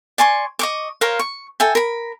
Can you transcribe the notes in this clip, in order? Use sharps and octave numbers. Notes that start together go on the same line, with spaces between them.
D5 G#5 C6 C#6
D#5 C#6 D6
A#4 C5 C#5 F5
C#6
A4 E5 G5 G#5
A#4 B5